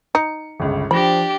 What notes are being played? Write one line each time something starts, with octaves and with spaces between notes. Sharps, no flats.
D#4 C#7
G1 C#2
F3 D4 G4 B5 A#6